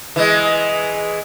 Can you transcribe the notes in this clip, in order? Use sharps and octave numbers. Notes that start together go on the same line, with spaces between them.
E3 G#3